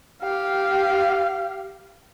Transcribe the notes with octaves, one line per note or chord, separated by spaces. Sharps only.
G4 F5